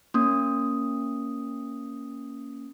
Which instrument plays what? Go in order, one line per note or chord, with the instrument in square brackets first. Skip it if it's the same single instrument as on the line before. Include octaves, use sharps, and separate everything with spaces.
[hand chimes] A#3 C#4 D#6